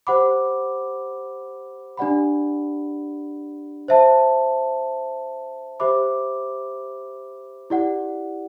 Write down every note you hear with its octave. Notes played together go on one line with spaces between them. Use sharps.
G4 C5 F#5 B5 D6
D4 G4 D5 F#5 B5
C5 E5 A5
G4 C5 E5 B5 D6
E4 G4 D5 F#5